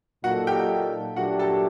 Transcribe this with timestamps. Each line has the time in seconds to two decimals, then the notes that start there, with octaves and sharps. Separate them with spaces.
0.24 A#2 F#3 A#3 D#4 F#4 A4 F#5
0.47 G4 G5
1.16 A#2 F#3 A3 D4 F#4 G4 F#5
1.39 A4 A5